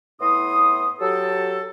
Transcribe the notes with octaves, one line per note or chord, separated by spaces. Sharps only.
A2 B3 E4 C6 D#6
F#3 G4 A4